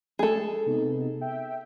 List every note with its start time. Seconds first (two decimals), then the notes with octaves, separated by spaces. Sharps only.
0.19 G#3 A3 G#4 A4
0.66 C3 B3 D#4
1.21 E5 G5